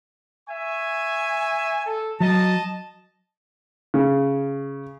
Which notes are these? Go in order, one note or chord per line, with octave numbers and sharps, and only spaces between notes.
E5 G#5 C#6
A4
F#3 D#5 A5
C#3